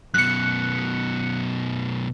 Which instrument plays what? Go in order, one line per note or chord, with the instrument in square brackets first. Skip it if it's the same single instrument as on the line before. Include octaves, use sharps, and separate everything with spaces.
[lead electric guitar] F#2 B2 [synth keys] F#6 C#7